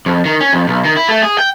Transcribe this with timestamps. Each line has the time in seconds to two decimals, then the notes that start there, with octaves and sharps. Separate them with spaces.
0.06 F2
0.26 D#3
0.40 C#4
0.53 F2
0.68 B1
0.85 D#3
0.97 E4
1.09 A3
1.22 G#4
1.39 G5